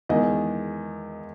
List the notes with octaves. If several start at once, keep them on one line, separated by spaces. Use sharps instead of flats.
E2 D#3 G#3 D#5